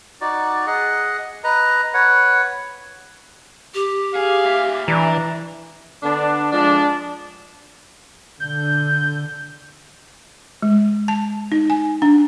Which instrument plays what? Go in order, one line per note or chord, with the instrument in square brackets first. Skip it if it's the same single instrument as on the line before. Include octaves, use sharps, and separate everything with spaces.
[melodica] D#4 F#4 D5
G#4 D#5 F#5
B4 D#5 A#5
B4 C#5 F#5
[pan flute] G4
[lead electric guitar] G#4 [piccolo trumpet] F5
[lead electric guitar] A#2 E5
[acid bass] E3 [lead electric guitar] D4 [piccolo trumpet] A#5
[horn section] D3 B3 D4
F3 G#3 D4
[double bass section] D3 [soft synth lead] G6
[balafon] G#3
A5
D#4
G#5
D4